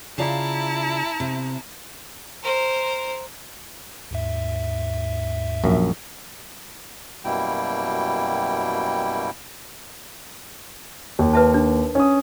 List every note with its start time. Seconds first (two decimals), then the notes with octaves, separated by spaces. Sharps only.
0.18 C#3 E4 F4 D5 A5 A#5
1.20 C3
2.43 A#4 C5
4.11 D#2 G#2 E5
5.64 A#1 F#2
7.25 F#2 B2 G3 A#3 E4 G5
11.19 D#2
11.33 B4 E5 A5
11.54 D4
11.95 C#4 D#6